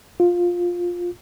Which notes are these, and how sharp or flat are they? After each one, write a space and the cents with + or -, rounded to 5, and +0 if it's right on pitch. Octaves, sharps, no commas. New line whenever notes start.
F4 +10